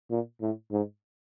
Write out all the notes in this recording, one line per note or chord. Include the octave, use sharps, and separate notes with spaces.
A#2
A2
G#2